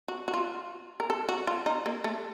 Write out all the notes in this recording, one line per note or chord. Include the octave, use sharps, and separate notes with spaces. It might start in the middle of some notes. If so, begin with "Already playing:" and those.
F#4
F#4
F4
A#4
A4
F#4
F4
D#4
A#3
A3